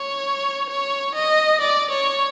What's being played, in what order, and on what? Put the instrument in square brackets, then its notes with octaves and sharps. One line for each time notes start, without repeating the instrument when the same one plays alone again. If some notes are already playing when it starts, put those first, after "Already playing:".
Already playing: [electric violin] C#5
C#5
D#5
D5
C#5